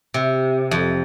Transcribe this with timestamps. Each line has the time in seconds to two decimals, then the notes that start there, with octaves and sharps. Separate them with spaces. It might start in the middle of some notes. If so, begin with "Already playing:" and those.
0.14 C3
0.71 F2